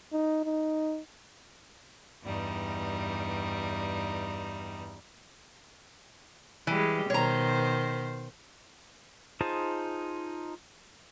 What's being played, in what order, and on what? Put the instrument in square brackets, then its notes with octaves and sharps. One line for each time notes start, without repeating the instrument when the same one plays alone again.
[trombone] D#4
D#4
[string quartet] E2 G2 G3 D#4
[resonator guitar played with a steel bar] E3 [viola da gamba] G3 G#3
[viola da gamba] B2 D#3 C5 [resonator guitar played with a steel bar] C#5 A#5
[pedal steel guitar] D#4 F4 G#4 C5 A5